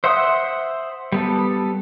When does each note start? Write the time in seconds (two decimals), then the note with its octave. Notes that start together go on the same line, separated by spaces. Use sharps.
0.04 C5 E5 F#5 C6 D#6
1.12 G3 B3 A4